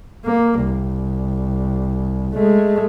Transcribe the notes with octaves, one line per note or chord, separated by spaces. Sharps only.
A#3
C2
G#3 A3